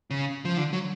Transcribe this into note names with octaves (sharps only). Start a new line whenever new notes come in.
C#3
F3
D3
F#3